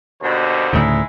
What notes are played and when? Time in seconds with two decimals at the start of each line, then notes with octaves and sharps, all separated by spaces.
0.22 D#2 B2 D3 C5
0.73 D2 A2 C#3 G#3 D#4 E4